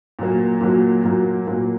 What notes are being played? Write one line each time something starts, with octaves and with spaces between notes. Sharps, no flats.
A#2 F#3 A#3
A#2 F#3 A#3
A#2 F#3 A#3
A#2 F#3 A#3